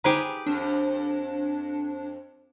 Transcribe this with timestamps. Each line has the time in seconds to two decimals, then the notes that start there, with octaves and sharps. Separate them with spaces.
0.04 D#4 G4 G#4 B4 C5 A#5
0.46 F2 D4